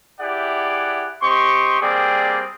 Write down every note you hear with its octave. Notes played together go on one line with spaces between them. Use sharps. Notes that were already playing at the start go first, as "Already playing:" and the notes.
E4 G4 G#4 D5 F#5
C4 G4 D#5 C6 C#6
G3 A#3 C4 G#4 D5 G5